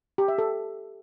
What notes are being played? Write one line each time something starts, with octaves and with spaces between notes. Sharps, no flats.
G4
E5
A4